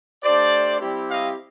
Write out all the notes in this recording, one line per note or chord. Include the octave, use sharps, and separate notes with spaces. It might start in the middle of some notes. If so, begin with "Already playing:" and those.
A3 D4 G4 C5 D5
G3 C4 E4 G4
D#5 F5